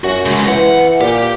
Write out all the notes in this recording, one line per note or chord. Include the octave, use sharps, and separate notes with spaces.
F#2 F#4
C#3 G#3
E3 F#5
A#2 G4